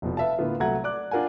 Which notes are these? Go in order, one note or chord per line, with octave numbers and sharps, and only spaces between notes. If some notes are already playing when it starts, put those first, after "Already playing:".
F1 B2 F3
B4 E5 F5 A5
A2 D3 A#3 B3 F4
C2 F#3 A3 F#5 A#5 G#6
D5 D6 F#6
D4 F4 A#4 F#5 G#5